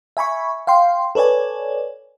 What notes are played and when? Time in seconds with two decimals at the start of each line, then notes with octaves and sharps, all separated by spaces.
0.17 E5 G#5 B5 C#6
0.67 F5 G5 C6
1.15 A4 B4 C#5 D5 G#5